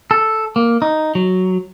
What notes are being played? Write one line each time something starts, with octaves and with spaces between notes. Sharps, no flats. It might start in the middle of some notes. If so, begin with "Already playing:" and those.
A4
A#3
D#4
F#3